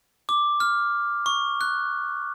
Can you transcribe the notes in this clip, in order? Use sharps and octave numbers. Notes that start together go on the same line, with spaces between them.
D6
F6
C#6
F#6